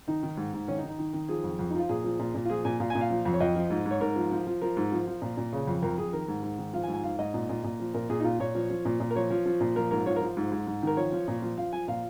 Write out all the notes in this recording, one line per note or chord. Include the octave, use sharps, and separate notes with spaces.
D#3 D#4
D#3
G#2
G#2
D#3 C#4
D#4
D#3
D#4
D#3
D#3
F3 G#4
F2
F2
F3 D#4
F4
A#2 G#4
F3
A#2
A#2
F4
F3 G#4
A#2 G#5
A#2 F5
A#2 G#5
F5
F3
F2
C#5
F2 D#5
F3
G#2
G#2
C#5
G#2 A#4
F3
F3
F3
F3 A#4
G#2
F3
F3
A#2
A#2
C#3
F2
F2 A#4
F2 G#4
D#3 A#4
G#2
G#2
D#3
F3 F5
G#5
G#2
G#5
G#2 F5
G#2 D#5
A#2
A#2
A#2
F3
A#2 A#4
A#2 G#4
D#4
A#2 F4
A#2 C#5
F3
F3
A#2
A#2
A#4
F3 C#5
F3
F3
A#2
F3 A#4
G#2 A#4
F3 C#5
A#4
F3
G#2
G#2
G#2
D#3 A#4
F3 C#5
F3
A#2
F3
F3 F5
F3 G#5
A#2 F5